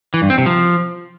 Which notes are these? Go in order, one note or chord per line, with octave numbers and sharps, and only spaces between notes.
E3
G2
C4
C3
F3